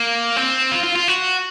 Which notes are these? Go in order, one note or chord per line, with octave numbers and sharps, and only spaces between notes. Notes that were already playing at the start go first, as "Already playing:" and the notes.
Already playing: A#3
C4
F4
F4
F4
F#4